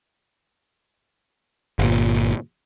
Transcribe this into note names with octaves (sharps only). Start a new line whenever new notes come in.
G1 A#2